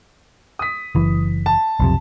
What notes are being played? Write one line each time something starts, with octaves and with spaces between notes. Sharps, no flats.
D#6 B6
F#1 E3
A5
B1 F2 C3